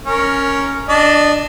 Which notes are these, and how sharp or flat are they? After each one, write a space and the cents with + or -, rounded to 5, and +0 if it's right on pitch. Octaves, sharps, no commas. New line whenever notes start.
C#4 +0 A#4 +0
D4 +0 D#5 -20